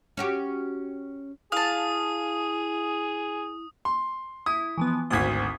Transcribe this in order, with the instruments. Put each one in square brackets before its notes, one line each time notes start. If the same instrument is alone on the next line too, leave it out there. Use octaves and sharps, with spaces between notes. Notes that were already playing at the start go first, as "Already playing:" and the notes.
[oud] C#4 F#4 G4
[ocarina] E4 [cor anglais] G#4 [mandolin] F5 A5 [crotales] D#6
[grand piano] C6
[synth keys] E4 [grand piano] D#6
[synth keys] E3 F3 B3
[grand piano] G#1 D2 [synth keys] D#6 G#6 B6